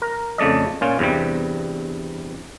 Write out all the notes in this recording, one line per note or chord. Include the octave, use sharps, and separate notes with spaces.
A#4
F2 C#3 A3 D5 D#5
A#2 C#4 F4
E2 G2 C3 G3